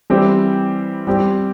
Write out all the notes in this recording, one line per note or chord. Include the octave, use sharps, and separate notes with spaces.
E3 G3 C4 E4 G4
G3 C4 G4